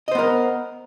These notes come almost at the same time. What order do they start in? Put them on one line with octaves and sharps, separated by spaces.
D#5 C5 B3 A#4